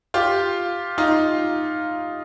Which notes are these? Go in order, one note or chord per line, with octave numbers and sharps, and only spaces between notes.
F4 G4
D#4 F4